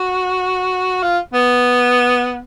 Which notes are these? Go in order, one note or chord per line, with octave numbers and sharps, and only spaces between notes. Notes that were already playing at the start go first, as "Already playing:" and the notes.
Already playing: F#4
F4
B3